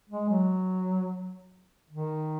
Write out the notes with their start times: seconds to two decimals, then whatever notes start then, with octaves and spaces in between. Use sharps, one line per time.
0.09 G#3
0.29 F#3
1.90 D#3